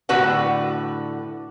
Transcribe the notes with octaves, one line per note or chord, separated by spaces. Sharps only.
A2 D3 F#4 B4 F#5